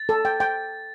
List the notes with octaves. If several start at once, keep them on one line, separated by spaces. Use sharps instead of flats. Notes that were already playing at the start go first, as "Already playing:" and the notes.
Already playing: A6
A4
G5
G5